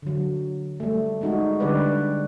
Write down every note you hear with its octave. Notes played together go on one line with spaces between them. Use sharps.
D3 F#3
G3 A3
G#3 D#4 F#4
D3 G3 D4 G4 B4 D5